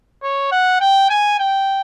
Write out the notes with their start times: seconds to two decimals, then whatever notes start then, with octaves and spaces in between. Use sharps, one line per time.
0.22 C#5
0.52 F#5
0.80 G5
1.10 G#5
1.39 G5